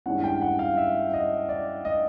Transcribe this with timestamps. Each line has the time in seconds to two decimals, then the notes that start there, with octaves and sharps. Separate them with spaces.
0.06 G2 D#3 G#3 C#4 E4 F#5
0.24 G5
0.42 F#5
0.59 F5
0.77 E5
1.14 D#5
1.49 D5
1.85 D#5